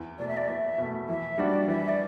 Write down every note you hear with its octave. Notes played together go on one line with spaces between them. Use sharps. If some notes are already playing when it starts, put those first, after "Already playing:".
Already playing: E2
B2 A3 D5
E5
D5
E2 E5
B2 A3
E3 E5
G3 D4 F#4 D5
E3 E5
D5